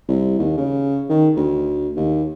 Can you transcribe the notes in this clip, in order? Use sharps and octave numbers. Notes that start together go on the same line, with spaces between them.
C2
D#2
C#3
D#3
D2
D#2